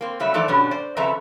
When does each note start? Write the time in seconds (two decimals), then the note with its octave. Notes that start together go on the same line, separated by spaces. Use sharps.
0.01 A#3 C4
0.20 C#3 F#3 G3 A3 E5
0.34 E3 F3 A3 D#4 A4 D5
0.48 G2 B2 F#3 G3 C#4 D4
0.71 C5 D5
0.97 F2 C#3 A4 B4 E5 A#5